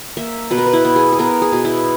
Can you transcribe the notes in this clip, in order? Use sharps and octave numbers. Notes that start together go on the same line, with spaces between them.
A#3 E5
B2 B4
A#4
B4
E4
B3
G#4
G#4
B3 A#4
G#4
B2
E4